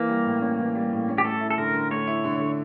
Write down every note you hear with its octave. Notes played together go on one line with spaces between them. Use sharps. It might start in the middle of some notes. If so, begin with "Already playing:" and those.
Already playing: E3 A#3
G3
A2
C#4
E3
G3
A2
C#4
G4
A3 A4
E4
A4
D3 A#4
D3
A3 C#5
E4
D3
D3